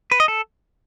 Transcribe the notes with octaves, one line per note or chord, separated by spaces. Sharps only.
B4
D#5
A4